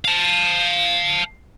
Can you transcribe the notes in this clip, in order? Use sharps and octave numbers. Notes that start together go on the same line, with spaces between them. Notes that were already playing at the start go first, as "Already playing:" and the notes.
F5 A5